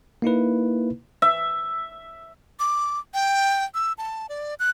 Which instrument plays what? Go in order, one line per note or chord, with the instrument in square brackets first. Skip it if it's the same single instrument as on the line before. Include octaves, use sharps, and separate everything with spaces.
[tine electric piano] A#3 D#4 E4 B4
[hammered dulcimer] E5
[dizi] D6
G5
E6
A5
D5
F#6